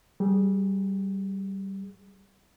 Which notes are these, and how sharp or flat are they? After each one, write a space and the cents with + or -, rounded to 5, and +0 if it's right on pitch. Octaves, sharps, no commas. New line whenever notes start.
G3 -15 G#4 +0